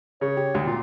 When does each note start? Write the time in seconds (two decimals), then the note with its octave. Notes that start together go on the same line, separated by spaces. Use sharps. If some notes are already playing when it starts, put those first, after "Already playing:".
0.21 C#3 C#5
0.37 G4
0.55 D2 G4
0.66 A#2 F4